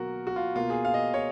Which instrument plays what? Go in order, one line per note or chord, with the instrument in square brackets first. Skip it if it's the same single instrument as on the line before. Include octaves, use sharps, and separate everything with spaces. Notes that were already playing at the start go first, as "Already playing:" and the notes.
Already playing: [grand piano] B2 F#3 A#3 F#4 A#4
F#4
F4
B2 A#3 F4
G#4
F5
D#5
C#5